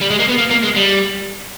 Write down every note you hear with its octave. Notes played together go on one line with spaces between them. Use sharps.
G3
G#3
A#3
B3
A#3
A#3
G#3
G3